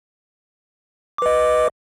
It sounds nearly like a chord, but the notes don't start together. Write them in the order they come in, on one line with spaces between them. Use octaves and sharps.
D6 B4 D#5